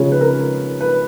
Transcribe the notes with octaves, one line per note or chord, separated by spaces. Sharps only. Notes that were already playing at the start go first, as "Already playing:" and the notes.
Already playing: C#3 F3 G#3 C#4 C#5
B4
A#4
B4